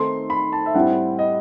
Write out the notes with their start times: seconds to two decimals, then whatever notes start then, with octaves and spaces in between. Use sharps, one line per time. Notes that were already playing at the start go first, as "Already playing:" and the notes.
Already playing: D#3 A3 C4 D#4 A4 C6
0.30 B5
0.53 A5
0.66 E5
0.74 A2 G3 C4 E4 G4 F#5
1.19 D#5